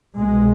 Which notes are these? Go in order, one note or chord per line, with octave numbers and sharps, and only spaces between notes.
C2 B2 G#3